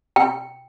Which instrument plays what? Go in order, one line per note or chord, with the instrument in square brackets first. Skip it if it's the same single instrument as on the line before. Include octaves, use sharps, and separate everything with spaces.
[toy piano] G5